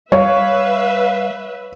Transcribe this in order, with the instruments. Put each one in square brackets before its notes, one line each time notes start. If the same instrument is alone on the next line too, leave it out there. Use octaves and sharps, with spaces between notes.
[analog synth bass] G3 [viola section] B4 E5 [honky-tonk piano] C#5 [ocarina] F5